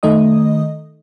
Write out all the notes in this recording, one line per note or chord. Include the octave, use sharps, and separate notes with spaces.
D#3 A3 D#4 D#5 D#6